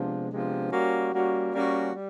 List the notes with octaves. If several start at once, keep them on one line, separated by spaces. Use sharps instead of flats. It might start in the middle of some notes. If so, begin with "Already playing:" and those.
Already playing: C3 F3 G#3 B3 D4
C3 F3 G#3 B3 D4
G3 A#3 C#4 F#4
G3 A#3 C#4 F#4
G3 A#3 C#4 F#4
G3